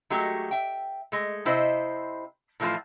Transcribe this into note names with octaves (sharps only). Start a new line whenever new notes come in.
F#3 G#3 A3 F#4 G4
E5 G5
G#3 A3
C3 E4 C5 D#5 E5
A2 E3 F3 A3 F4 A5